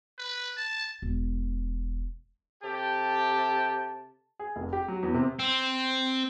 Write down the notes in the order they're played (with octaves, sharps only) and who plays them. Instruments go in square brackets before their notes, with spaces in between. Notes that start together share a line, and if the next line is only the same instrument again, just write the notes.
[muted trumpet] B4
A5
[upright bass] E1
[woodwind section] C3 A4 A5 [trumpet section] G4
[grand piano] G#4
F1
G4
F#3
E2
C3
[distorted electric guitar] C4